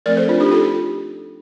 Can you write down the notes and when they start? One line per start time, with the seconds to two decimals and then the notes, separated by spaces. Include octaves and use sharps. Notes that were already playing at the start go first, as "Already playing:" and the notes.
0.06 F3 A3 C4 A#4 D5
0.17 A4 C5
0.28 D4 F4
0.40 D#4 G4
0.51 F4 A4